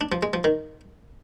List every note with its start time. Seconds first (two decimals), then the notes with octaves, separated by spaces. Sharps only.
0.01 D4
0.12 F3
0.23 G#3
0.33 F3
0.44 D#3